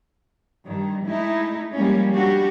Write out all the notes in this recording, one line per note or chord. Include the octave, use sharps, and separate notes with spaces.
G2 D#3
G#3 A3 D#4 E4
F3 G3 G#3 A#3 C#4
G3 D4 F#4 G4